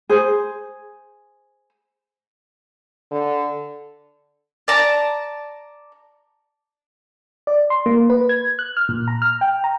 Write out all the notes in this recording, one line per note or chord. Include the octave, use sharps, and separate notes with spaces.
G#4 C5
D3
D5 A5 A#5
D5
C6
A#3
B4
G#6
F#6
F6
A#2
A#5
F6
G5
A#5